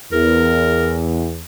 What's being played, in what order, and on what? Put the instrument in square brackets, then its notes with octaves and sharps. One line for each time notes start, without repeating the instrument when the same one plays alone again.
[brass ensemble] E2 [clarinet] A#4